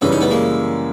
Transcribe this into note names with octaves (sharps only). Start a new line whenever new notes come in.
F#2 C#3 E3 G3 B3 C#4
C#4 D#4
A3 B3
G#3 A#3